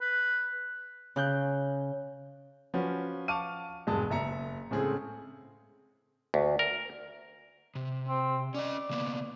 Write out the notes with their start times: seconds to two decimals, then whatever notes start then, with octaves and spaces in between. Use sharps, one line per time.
0.01 B4
1.16 C#3 F#6 G6
2.74 F3 C#4 F#4 B4
3.28 F5 A5 C#6 D6 F6 D#7
3.87 E1 G2 G#3 A5 D#6
4.11 F#1 E5 A#5 C#7
4.71 A2 C#3 G#3 A3 C4 G#4
6.34 D2
6.59 A#4
7.75 C3
8.08 C4
8.54 C#4 D5 D#5
8.90 C#3 A#3 B3